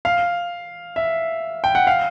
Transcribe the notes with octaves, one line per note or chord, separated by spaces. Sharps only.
F5
E5
G5
F#5
F5